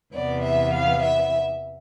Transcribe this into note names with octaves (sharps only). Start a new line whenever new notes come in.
E2 C3 E3 B3 D5
E5
F5
E5